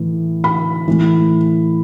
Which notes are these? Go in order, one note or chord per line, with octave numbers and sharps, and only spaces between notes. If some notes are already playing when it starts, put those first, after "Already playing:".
Already playing: A2 E3
B5
A2 E3